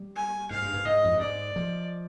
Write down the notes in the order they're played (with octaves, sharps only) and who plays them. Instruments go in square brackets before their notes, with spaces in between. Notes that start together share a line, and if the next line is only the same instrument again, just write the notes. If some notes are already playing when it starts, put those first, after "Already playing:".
Already playing: [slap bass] G3
[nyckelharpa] G#5
[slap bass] G#2 [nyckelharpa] F5
[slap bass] G2
G#2
[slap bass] G#2 [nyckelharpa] D#5
[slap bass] F2
G2
[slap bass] G#2 [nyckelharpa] D5
[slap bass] F3